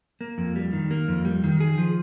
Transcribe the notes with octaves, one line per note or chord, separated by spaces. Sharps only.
A#3
F2
G3
D#3
A#3
F2
G3
D#3
G#4
F3